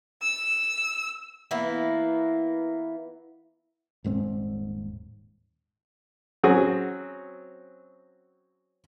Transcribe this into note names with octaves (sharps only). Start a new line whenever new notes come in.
E6
E3 A#3 B3 E4
D#1 G#2 A3 C4
F#3 C4 C#4 F#4 G#4